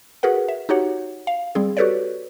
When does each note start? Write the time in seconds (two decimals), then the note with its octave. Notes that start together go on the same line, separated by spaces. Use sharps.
0.23 F#4 G#4 A#4 B4 F#5
0.48 E5
0.69 D#4 F#4 G4 C#5 F#5
1.27 F5
1.55 G3 C4 G#4
1.77 F#4 G4 A4 B4 C#5 D5